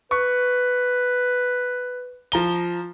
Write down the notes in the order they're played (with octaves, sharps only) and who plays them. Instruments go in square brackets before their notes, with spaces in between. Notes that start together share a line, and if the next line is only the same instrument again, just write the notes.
[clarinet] B4 [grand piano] C#6
[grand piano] F3 A#5 G7